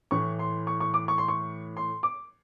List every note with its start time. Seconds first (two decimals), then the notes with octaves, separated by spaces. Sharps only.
0.11 A2 E3 C#6
0.39 C6
0.67 C#6
0.80 C#6
0.94 D6
1.08 C#6
1.18 C6
1.28 C#6
1.77 C6
2.03 D6